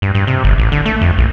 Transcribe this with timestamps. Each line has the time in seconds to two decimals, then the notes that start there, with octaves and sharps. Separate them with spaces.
0.02 G2
0.15 G2
0.27 C3
0.44 G1
0.58 A1
0.72 D3
0.86 A3
1.01 F2
1.18 A#1